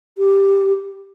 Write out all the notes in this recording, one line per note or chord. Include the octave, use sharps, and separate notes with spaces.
G4